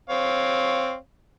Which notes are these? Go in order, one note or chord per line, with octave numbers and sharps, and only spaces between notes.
C4 C#5 F5